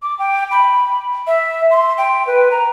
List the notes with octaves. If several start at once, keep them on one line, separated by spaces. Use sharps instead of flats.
D6
G5
B5
E5
C6
G5
B4
A#5